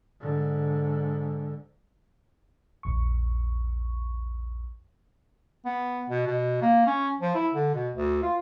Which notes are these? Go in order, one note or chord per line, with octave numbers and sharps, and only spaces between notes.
G#2 D3
A#1 E2 C#6
B3
B2
B2
A#3
C#4
F3
E4
D3
B2
D2
F4